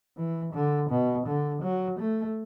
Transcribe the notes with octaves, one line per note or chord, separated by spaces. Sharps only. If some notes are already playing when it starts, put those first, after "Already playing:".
E3
D3
B2
D3
F#3
A3